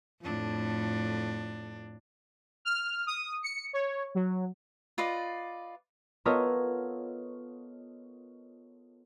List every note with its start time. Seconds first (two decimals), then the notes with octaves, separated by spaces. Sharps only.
0.22 F2 A2 D4
2.65 F6
3.07 D#6
3.43 C#7
3.73 C#5
4.15 F#3
4.98 F4 B4 D5 D#5
6.25 B3 F4 A4 A#4 C#5 D#5